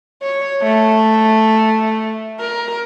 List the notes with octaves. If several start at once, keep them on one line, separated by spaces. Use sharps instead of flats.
C#5
A3
A#4